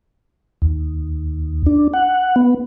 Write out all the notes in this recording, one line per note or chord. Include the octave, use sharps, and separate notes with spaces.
D#2
D4
F#5
B3